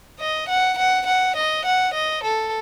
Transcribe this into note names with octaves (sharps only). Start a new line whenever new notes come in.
D#5
F#5
F#5
F#5
D#5
F#5
D#5
A4